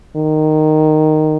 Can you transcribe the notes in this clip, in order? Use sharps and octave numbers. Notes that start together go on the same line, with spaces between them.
D#3